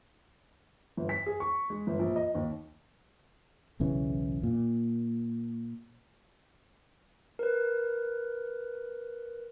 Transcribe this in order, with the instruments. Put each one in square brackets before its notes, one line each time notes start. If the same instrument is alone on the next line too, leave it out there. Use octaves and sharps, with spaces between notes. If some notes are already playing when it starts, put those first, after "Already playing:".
[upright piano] G1
B6
G#4
C#6
G#3
G1
A#1
D#5
D#2
[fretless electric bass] B1 E2 C#3 E3
A#2
[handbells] A#4 B4